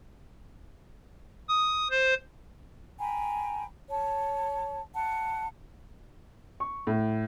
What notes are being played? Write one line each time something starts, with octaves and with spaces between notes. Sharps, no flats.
D#6
C5
G5 G#5 A#5 B5
C#5 A5
F#5 A5
C#6
A2